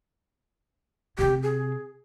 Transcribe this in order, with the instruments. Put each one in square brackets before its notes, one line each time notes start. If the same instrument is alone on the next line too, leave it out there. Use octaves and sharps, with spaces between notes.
[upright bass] C3 C4 [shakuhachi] G4
[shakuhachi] G#4